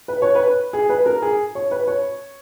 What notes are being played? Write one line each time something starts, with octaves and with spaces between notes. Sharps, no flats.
B4
C#5
B4
G#4
B4
A#4
G#4
C#5
B4
C#5